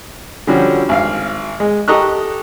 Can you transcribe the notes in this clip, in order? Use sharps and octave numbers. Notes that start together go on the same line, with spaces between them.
D3 F3 G3 C#4 F#4
G#1 F5
G#3
G4 A4 D#5 A#5 C#6 F#6